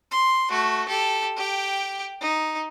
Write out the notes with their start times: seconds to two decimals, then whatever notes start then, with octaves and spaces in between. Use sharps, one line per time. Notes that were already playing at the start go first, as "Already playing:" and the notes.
0.11 C6
0.50 A3 F#4
0.88 G4 A4
1.37 G4 G5
2.21 D#4